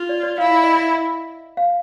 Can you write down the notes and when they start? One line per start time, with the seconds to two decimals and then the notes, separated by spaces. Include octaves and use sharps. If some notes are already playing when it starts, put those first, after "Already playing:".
Already playing: F4
0.09 D5
0.23 D5
0.38 E4 F5
0.51 E5
0.64 D#5
0.76 E5
1.57 F5